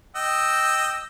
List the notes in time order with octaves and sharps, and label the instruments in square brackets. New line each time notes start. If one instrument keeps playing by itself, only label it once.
[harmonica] D#5 G5 E6